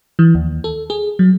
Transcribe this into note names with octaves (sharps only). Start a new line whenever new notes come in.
E3
D#2
A4
G#4
F#3